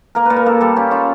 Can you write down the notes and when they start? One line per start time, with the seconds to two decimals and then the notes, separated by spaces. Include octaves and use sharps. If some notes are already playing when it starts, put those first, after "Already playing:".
0.15 A#3 A#4
0.26 A#2 B4
0.36 A#4
0.46 A#3 A4
0.61 G3 A4
0.76 C#4 G4
0.91 C#4 F4